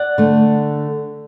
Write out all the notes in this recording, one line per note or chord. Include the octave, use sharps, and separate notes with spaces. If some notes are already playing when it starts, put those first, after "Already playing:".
Already playing: D5 F#5
D3 A3